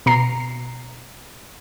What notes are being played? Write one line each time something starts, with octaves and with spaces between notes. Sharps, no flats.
B2 A#5 C7